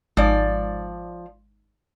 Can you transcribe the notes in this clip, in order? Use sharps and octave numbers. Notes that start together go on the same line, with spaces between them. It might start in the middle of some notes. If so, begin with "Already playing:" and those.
G#1 F3 D5